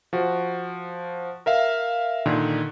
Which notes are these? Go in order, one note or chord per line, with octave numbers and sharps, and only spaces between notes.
F3 F#4
A#4 E5 F5
A#2 D3 D#3